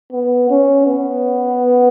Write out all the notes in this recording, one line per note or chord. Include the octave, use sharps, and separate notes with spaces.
B3
C#4
B3